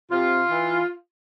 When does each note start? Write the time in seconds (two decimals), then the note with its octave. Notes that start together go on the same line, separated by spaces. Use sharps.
0.10 C3 F4
0.49 E3